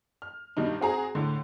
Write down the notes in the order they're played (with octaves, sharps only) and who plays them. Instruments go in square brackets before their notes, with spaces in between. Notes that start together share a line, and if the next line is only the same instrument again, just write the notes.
[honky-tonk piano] F6
G2 B2 D#3 A#3 D#4
C4 F#4 G#4 A#5
A2 D3